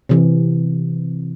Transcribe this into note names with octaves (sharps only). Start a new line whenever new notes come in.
C3 E3